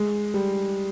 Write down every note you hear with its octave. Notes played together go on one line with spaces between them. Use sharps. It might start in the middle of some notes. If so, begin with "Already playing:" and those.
Already playing: G#3
G3